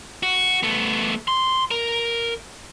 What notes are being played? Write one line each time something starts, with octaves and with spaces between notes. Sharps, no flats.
F#4
A3 B3
C6
A#4